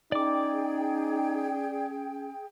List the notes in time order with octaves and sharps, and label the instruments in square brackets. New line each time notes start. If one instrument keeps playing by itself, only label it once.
[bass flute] C#4 [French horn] D#4 [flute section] G#4 G5 [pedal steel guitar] D5 D6